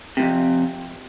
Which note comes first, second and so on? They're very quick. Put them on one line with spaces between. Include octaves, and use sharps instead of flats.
C3 G#2 F2